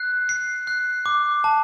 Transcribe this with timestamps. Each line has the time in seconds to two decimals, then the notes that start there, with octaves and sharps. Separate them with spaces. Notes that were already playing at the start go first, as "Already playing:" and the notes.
Already playing: F#6 C7
0.29 C7
0.67 F#6
1.06 D6
1.44 A5